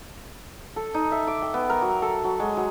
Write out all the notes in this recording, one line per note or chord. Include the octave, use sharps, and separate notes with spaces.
A4
D#4
E5
D6
G5
B3
A#4
F#3
A4
F#3
G#3
F#3